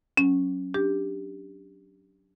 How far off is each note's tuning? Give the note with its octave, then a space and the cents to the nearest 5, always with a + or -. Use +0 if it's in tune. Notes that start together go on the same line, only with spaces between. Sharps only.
F#3 +0 C#4 -10
D4 +0 G4 +5